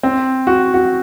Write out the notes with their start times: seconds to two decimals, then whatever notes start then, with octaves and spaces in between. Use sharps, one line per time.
0.03 C4
0.47 F#4
0.74 F#4